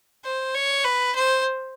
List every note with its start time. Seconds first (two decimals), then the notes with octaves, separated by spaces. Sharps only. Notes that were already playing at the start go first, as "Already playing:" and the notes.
0.24 C5
0.54 C#5
0.84 B4
1.15 C5